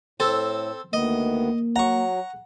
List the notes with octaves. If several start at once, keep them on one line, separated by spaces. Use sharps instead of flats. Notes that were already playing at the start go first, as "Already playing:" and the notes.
A2 C4 A4
D2 D#3 A#3 B3 D#5
F#3 F#5 A#5 C#6